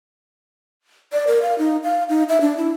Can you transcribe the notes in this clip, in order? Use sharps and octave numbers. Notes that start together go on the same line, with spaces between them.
D5
A#4
F5
D#4
F5
D#4
E5
D4
E4